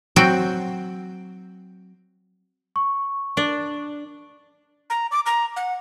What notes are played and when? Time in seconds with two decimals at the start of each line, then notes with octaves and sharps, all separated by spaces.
0.16 F#3 C4 F#4 G5
2.76 C#6
3.37 D4
4.90 A#5
5.11 D6
5.26 A#5
5.56 F#5